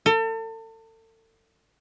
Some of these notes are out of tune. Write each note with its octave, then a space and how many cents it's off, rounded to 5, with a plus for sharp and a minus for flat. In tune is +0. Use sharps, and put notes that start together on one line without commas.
A4 +35